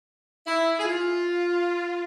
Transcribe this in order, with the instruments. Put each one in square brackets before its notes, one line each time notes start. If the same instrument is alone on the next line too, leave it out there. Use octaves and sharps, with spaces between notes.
[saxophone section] E4
G#4
F4